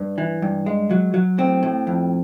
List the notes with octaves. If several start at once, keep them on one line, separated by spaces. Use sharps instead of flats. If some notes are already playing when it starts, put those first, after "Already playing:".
Already playing: G2
E3
G2
G#3
F#3
F#3
A2 C4
A2
F2